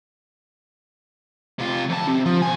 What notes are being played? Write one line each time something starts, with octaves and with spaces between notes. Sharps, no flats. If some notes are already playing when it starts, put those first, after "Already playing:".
C3 F4
F2 A5
C3
F3
B2 G#5